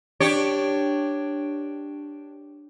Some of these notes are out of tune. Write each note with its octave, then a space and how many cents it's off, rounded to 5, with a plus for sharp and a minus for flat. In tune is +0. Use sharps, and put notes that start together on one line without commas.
D4 +0 G4 +0 C#5 +0